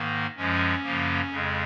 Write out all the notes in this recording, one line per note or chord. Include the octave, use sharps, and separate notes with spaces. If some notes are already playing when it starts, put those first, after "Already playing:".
Already playing: G#2 D#3 A#3
F#2 F3 G#3 C#4
F#2 C#3 F3 A#3
F2 C#3 G#3